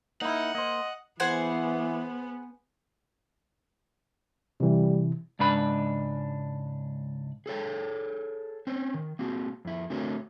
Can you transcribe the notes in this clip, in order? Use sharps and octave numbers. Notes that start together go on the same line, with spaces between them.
A#3 D#4 E4 F#5
A#3 C5 D#5
E3 B3 G#4 C5 F#5
C3 E3 G3
C#2 G#2 D4 B4 B5
G#4 A4 C#5 G5
C4 C#4 C5 C#5
D#3
A#3 C4 F#4 G#4
F2 E4
D3 A3 C4 F#4 A#4 C#5